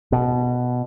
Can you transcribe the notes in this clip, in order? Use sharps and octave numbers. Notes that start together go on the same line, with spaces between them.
B2